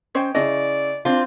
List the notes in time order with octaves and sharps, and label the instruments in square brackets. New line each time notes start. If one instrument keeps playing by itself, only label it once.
[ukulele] C#4 C5 C#5 [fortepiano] D#5 G5
[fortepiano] C#3 E4 [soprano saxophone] D5 [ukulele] D#5
[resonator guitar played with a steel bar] C4 F4 [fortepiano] D4